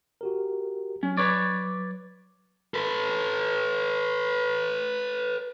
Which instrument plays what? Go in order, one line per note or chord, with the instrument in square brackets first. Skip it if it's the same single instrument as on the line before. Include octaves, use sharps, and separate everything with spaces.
[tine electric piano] F#4 G4 A#4
[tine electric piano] F#3 [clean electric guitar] C#4
[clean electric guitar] B4 C#5 D5
[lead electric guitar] A4 B4